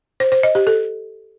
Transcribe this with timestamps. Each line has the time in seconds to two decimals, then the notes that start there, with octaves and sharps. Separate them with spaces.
0.20 C5
0.32 C5
0.43 D#5
0.55 G4
0.67 A4